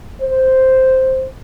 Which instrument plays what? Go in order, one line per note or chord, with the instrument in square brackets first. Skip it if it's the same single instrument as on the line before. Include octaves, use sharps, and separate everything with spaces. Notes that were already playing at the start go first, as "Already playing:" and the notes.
[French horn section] C5